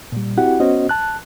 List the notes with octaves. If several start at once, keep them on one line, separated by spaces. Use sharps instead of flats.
A#2 G3
C4 E4 F#4 G4 F#5
B3 C#4 F#4 C5 D#5
A5 F#6